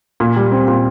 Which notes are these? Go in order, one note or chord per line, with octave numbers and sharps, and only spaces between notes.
A#2
G3
C4
A#2